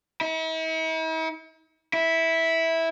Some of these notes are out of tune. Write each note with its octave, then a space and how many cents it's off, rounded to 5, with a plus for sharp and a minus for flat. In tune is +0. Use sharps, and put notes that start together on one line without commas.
E4 -45
E4 -10